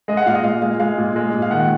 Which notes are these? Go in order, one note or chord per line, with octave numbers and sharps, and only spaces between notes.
G#3 D#5
F#5
A#2 F5
D#5
G#3 F5
G#3 F5
G#3 F5
A#2
G#3
A#2
F5
D#3 F#5